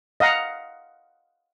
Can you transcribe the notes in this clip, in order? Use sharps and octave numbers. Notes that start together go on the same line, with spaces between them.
D#5 F5 F#5 A#5